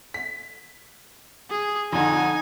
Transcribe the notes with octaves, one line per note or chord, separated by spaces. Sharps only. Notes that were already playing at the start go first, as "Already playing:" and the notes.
B6
G#4
F2 D3 D#4 G#5